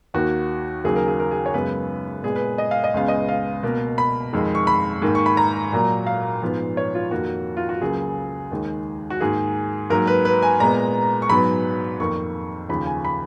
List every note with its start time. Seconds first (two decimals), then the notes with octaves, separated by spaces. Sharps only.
0.14 D#2 D#3 A#3 F#4
0.84 D#2 C#3 F#3 A#3 G#4
0.96 A#4
1.08 G#4
1.20 A#4
1.31 G#4
1.46 C#5
1.54 F#2 C#3 G#3 B3 B4
2.23 A#2 G#3 B3 G#4
2.36 B4
2.58 D#5
2.71 F5
2.84 D#5
2.94 C#2 C#3 G#3 B3 F5
3.08 D#5
3.29 F5
3.63 B2 A#3
3.98 B5
4.33 F2 D#3 G#3
4.55 C#6
4.67 B5
5.02 G#2 D#3 A#3
5.15 C#6
5.26 B5
5.37 A#5
5.72 A#2 F#3 A#3
6.06 F5
6.42 G#2 F3 B3
6.77 C#5
6.95 F4
7.11 F2 D#3 A#3 F#4
7.57 F4
7.69 F#4
7.81 C#2 C#3 F#3 A#3 G#4
8.52 D#2 D#3 G#3
9.10 F#4
9.20 G#2 D#3 A#3 G#4
9.90 G#2 F#3 A#3 A#4
10.07 B4
10.25 B4
10.42 G#5
10.60 A#2 G#3 B3 A#5
11.22 C#6
11.29 G#2 F#3 B3 B5
12.00 F2 D#3 A#3 C#6
12.69 D#2 C#3 F3 B5
12.86 G#5
13.05 B5